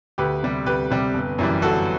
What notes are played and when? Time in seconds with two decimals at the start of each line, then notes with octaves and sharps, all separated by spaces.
0.18 D2 G4 B4
0.43 C3 G3
0.66 D2 G4 B4
0.90 C3 G3
1.14 G1
1.38 F#2 E3 G3
1.62 G1 F#4 A4